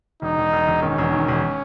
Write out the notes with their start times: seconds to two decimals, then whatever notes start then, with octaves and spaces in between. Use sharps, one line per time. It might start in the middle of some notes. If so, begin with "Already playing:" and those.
0.22 E1 D#4
0.38 E1
0.53 E1
0.68 E1
0.82 D#3 C#4
0.98 E1
1.13 D#3
1.28 E1